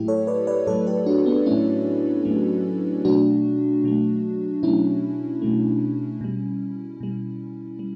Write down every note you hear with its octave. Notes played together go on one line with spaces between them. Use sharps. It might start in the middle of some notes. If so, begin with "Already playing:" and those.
Already playing: A2 F#3 A3 E4 G4
A4 C#5
B4 D5
B4 D5
A2 F#3 A3 A4 C#5
G4 B4
D4 F#4
B3 D4
A2 F#3 A3 C#4 E4
A2 F#3 A3
B2 F#3 A3 D4 F#4
B2 F#3 A3
B2 F#3 A3 C#4 E4
B2 F#3 A3
B2 G3
B2 G3
G3